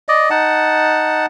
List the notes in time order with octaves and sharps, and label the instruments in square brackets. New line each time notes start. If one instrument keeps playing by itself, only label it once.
[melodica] D5 D#5
D#4 F#5 A5